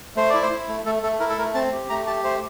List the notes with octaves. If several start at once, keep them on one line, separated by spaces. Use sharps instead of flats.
A3 C5
E4 D5
C5
E4
A3
A3 A4
A3 A4
E4 A#4
A4
A3 A#4
C4 A5
G4
A3 A#5
G4 A5
A3 C5